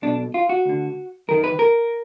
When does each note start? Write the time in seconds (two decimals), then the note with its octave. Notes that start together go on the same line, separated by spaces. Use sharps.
0.02 B1 B2 D4
0.34 F4
0.49 F#4
0.65 D2 D3
1.28 F#2 D#3 A#4
1.44 B4
1.59 A#4